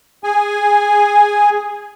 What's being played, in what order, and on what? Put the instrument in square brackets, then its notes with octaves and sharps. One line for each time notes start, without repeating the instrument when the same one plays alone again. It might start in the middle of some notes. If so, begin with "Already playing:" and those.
[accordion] G#4 G#5